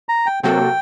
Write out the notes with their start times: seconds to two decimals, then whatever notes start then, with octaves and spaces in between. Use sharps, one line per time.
0.09 A#5
0.26 G5
0.43 C3 F#3 A#3 F#4 A4 G5